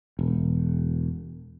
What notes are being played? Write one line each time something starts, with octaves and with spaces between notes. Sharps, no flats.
E1